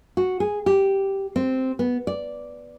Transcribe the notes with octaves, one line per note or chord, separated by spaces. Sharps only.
F#4
G#4
G4
C4
B3
D5